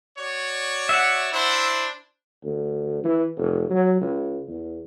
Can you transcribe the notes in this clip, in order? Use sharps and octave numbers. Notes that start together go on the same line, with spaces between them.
F#4 C#5 D5
E5 F#5
D4 E4 C5
D2
E3
F1
F#3
C#2
E2